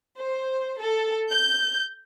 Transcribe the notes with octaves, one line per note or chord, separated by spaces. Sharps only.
C5
A4
G6